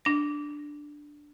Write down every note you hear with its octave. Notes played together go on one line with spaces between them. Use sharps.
D4 A#6